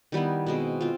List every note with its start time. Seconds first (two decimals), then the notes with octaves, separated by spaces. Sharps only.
0.12 D#3 G3 B3 E4
0.46 B2 G#3 C4
0.81 C4 F4